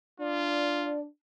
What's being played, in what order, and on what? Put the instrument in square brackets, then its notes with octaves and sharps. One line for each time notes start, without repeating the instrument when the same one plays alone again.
[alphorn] D4 [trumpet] F4 [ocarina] D5